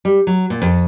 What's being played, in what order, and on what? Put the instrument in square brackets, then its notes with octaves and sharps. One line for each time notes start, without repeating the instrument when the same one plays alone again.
[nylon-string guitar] G3
F#3
A#2
F2